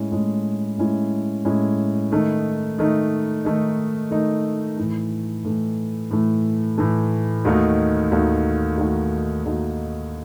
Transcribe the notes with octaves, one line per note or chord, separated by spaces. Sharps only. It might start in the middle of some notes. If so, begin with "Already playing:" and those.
Already playing: A2 G#3 C#4 E4
A2 G#3 C#4 E4
A2 G#3 C#4 E4
A2 G#3 C#4 E4
D#3 A3 D#4
D#3 A3 D#4
D#3 A3 D#4
D#3 A3 D#4
A2 E3 A3
A2 E3 A3
A2 E3 A3
A2 E3 A3
D#2 D#3 A3 D#4 F#4
D#2 D#3 A3 D#4 F#4
D#2 D#3 A3 D#4 F#4
D#2 D#3 A3 D#4 F#4